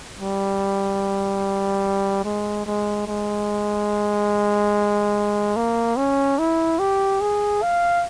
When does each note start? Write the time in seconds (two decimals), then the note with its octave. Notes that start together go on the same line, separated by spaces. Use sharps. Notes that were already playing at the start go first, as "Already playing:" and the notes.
0.19 G3
2.25 G#3
2.66 G#3
3.07 G#3
5.56 A#3
5.97 C#4
6.39 E4
6.79 G4
7.21 G#4
7.63 F5